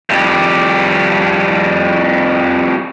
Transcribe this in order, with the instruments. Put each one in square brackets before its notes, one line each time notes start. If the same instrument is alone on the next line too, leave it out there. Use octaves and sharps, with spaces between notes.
[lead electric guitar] F2 G3